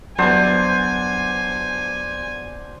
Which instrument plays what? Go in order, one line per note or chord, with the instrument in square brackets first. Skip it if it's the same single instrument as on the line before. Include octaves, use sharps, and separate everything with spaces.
[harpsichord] E2 G2 [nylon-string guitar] F#3 F#5 [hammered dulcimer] D4 C5 [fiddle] G#5